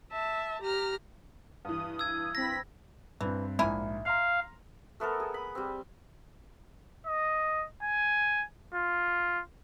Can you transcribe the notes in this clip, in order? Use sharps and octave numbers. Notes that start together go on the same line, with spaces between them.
E5 A5
G4 A#5 F6
G2 E3 D#6
E6 G#6
C4 B5 A#6 B6
G2 E3 C4
A#1 G#2 A#3 E4 G#5
F5 A#5 C6 F6
A3 B3 A4 A#4
G#4
B5
G3 C4
D#5
G#5
F4